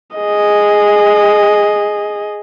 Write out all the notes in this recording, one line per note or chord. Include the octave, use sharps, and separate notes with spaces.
G#4 D#5